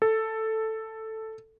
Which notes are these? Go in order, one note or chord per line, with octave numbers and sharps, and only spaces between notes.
A4